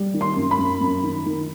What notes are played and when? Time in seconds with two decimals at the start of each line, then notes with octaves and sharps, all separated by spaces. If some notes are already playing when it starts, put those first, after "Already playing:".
Already playing: G3
0.14 D#3
0.21 C6
0.36 F#2
0.51 B5
0.58 F#2
0.81 F#2
1.03 D#3
1.26 D#3